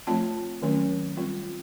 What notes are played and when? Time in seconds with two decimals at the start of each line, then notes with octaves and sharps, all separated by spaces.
0.07 F3 A3 C4 F4 A5
0.62 D#3 F#3 A3 C#4
1.17 G3 C4 F4